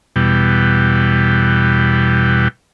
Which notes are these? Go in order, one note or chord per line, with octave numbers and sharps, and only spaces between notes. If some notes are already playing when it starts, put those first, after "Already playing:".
E2 B2 G3